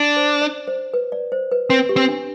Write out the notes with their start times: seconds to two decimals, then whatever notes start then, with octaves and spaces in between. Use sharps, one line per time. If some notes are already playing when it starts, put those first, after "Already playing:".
Already playing: D4
0.16 C5
0.42 D5
0.67 C5
0.94 B4
1.12 D5
1.32 C5
1.51 B4
1.69 C4 B4
1.89 G4
1.96 C4
2.09 D4